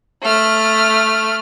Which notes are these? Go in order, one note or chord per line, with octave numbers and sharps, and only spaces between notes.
A3 F6